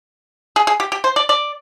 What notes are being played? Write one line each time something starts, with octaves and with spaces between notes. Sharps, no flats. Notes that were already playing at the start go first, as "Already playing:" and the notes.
G#4
G#4
G4
G4
C5
D5
D5